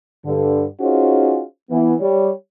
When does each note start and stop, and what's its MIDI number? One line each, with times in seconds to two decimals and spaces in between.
0.25 0.65 43
0.25 0.65 50
0.80 1.42 61
0.80 1.42 63
0.80 1.42 65
0.80 1.42 66
0.80 1.42 68
0.80 1.42 72
1.70 1.93 52
1.70 1.93 59
1.99 2.29 55
1.99 2.29 73